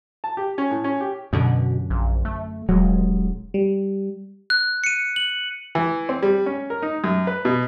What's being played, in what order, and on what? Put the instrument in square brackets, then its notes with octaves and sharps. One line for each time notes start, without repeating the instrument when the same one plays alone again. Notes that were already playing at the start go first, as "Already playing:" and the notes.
[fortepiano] A5
G4
C#4
A2
C#4
G4
[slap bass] F#2 D3 [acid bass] B2
[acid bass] A#1
A3
[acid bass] D#1 [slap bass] F#3 G#3
[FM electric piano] G3
[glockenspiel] F#6
C#7 D#7
F#7
[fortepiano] E3
C4
G3
C#4
A#4
D#4
F#2
B4
B2